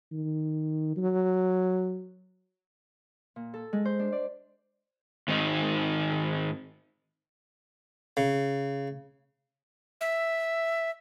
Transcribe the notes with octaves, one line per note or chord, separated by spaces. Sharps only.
D#3
F#3
A#2
A4
G#3
C5
D4
D5
G#2 D#3 C4 D#4
C#3
E5